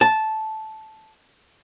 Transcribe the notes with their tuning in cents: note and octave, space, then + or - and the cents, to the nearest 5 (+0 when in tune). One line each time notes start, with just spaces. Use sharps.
A5 -10